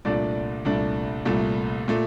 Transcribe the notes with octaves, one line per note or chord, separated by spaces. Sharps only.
C2 A#2 A3 D4 D5
C2 A#2 A3 D4
C2 A#2 A3
A#2 A3